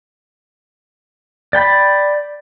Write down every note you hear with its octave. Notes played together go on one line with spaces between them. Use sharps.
D5 G5 B5